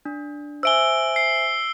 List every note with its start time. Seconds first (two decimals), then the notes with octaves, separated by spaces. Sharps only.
0.05 D4
0.63 C5 E5 G#5 E6 D7 G7
1.16 C7